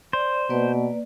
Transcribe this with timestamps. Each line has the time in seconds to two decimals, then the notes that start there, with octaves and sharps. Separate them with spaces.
0.13 C5 D5
0.50 B2 A#3 B4 D5